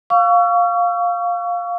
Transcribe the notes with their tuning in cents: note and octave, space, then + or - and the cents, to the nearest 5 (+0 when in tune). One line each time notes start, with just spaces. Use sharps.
F5 +10 C#6 +30 E6 +40